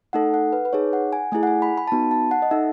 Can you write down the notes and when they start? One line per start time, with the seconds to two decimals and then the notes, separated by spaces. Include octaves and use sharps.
0.13 A3 D#4 A4 F#5
0.34 F#5
0.53 B4
0.65 B4
0.73 D#4 G#4 C#5
0.93 F#5
1.13 G#5
1.32 A3 E4 G#4 G#5
1.43 F#5
1.47 G#5
1.62 B5
1.78 B5
1.88 A5
1.92 B3 D#4 F#4 B5
2.11 A5
2.31 F#5
2.42 D#5
2.51 D#4 A4 E5